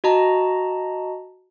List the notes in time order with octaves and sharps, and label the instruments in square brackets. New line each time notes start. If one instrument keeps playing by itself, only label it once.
[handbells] F#4 D#5 A5 A#5